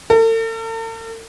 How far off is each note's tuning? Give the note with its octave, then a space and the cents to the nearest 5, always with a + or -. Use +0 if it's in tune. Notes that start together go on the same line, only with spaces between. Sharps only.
A4 +45